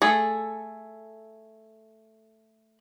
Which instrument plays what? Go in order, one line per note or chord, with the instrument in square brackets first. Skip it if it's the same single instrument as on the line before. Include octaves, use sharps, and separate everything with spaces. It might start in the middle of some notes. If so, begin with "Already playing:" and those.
[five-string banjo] A3 G#4 A4